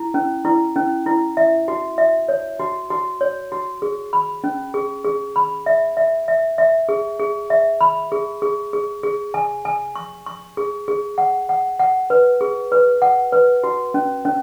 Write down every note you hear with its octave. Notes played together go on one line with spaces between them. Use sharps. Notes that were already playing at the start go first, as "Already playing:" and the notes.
Already playing: E4
C#4
E4
C#4
E4
E5
F#4
E5
C#5
F#4
F#4
C#5
F#4
G#4
B5
C#4
G#4
G#4
B5
E5
E5
E5
E5
G#4
G#4
E5
B5
G#4
G#4
G#4
G#4
G#5
G#5
C#6
C#6
G#4
G#4
F#5
F#5
F#5
B4
G#4
B4
F#5
B4
F#4
C#4
C#4